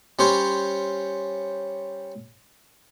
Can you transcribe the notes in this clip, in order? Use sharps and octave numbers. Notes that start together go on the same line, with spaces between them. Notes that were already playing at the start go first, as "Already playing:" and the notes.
G3 C#4 C5 C#5